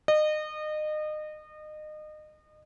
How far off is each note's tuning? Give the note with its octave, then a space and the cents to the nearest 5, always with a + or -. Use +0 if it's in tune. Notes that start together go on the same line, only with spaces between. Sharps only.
D#5 -30